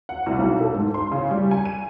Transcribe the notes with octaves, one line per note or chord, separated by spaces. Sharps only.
F#5
C2
B1
A4
G#2
C6
C#3
G3
G#5
D#7